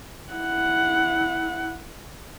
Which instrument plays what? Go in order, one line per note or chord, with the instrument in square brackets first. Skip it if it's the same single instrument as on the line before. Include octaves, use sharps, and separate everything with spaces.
[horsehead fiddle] E4 F#5